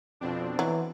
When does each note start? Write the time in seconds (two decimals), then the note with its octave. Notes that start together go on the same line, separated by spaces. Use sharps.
0.21 F2 B2 C4 D4
0.59 E3 F#3